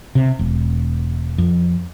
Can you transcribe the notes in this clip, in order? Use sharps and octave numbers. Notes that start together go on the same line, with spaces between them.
C3
E1
F2